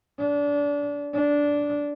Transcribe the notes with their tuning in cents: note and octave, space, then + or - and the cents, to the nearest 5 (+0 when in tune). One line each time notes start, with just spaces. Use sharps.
D4 -25
D4 -10